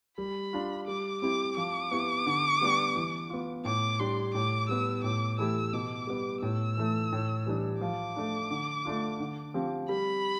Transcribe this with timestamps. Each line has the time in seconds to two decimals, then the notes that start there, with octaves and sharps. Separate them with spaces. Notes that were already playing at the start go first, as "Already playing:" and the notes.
0.18 G3 B5
0.53 D4 F4
0.87 G3 D6
1.22 C4 E4 G4 D6
1.57 F3 D6
1.91 B3 E4 G4
2.26 D3
2.61 G3 B3 D4 G4
2.95 E3
3.30 B3 F4
3.65 A2 D6
4.00 G3 D4 G4 C6
4.34 A2 D6
4.69 G3 B3 E6
5.03 A2 D6
5.38 E3 A3 E4 G4 E6
5.73 B2 D6
6.07 G3 B3
6.42 A2 E6
6.77 E3 A3
7.12 A2
7.46 E3 G3 D4
7.81 F3 D6
8.16 A3 D4
8.51 D3
8.85 A3 D4 F4
9.20 D3
9.54 F3 C4 G4
9.89 G3 B5